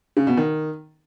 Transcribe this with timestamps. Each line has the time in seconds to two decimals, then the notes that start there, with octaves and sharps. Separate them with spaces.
0.17 C#3
0.27 B2
0.37 D#3